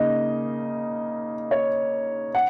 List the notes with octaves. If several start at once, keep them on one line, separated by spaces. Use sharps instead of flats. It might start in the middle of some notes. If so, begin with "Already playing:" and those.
Already playing: C#3 A#3 D#4 D#5
C#5
F#5